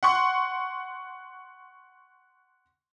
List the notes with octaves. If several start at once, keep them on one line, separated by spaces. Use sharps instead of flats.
F#5 C6 C#6